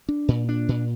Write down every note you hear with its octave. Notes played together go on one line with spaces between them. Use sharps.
D4
A#2
D4
A#2